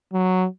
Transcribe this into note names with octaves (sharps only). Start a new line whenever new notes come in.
F#3